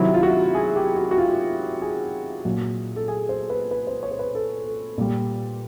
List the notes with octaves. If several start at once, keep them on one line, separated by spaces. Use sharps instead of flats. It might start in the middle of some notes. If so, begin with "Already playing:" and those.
Already playing: C3 D#3 F#3 E4
F4
F#4
G#4
G4
F#4
F#4
F4
G#4
A#2 F#3
A4
G#4
C5
B4
B4
C5
C#5
C5
B4
A4
A4
A#2 G3